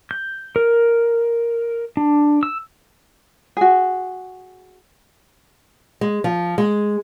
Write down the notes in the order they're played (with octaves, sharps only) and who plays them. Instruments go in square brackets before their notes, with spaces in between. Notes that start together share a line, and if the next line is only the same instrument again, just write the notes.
[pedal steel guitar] G6
A#4
D4
E6
[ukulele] F#4 G#4
[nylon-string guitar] G#3
F3
G#3